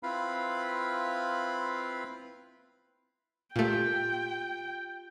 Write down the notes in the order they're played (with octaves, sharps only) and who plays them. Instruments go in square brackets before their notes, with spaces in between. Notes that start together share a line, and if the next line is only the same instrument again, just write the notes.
[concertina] C4 E4 F4 B4 F5 B5
[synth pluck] A#2 A3 [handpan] F4 G4 [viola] G5